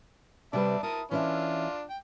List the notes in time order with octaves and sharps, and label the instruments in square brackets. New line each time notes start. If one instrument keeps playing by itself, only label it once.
[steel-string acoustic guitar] C3 G3 B4 [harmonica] D5 E5 A5
[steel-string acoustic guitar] E4 [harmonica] A#4 A5 D#6
[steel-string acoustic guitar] E3 C#4 E5 [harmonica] D4 F4
[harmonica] G5